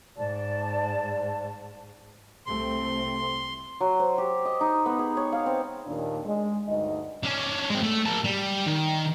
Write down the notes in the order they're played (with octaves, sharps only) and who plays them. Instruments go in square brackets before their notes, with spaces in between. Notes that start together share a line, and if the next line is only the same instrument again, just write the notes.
[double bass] G#2 [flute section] D5 A5
[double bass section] C2 A3 C4 [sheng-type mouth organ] C6
[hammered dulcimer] F#3
C5
G4
D#5
D#4
B3
G#4
C#5
F5
C4
[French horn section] D#2 A#2 D#3 D4
G#3
D2 G2 D#4 D#5
[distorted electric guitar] C#4 D4
G#3 C4
A3
A#3 A5
G3
D#3